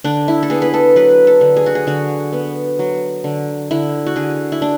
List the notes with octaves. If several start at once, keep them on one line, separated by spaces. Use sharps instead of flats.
D3 D4
E4
A4
B3 G#4
B4
A4
F#3 B4
A4
D3
G#4
F#4
G#4
D3 F#4
B3
F#3
D3
D3 E4
F#4
D3 G#4
E4
D4